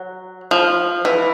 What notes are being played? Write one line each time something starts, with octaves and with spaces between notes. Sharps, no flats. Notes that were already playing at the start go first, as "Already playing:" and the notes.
Already playing: F#3
F3
E3